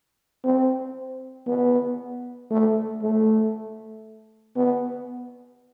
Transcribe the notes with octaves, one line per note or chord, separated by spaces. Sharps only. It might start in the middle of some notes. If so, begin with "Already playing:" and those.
C4
B3
A3
A3
B3